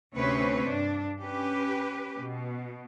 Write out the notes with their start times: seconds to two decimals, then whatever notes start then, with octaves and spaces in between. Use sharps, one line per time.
0.14 D2 C3 C4 C#4 B4 C#5
0.67 G2 D4
1.21 C#4 G4 B4
2.17 B2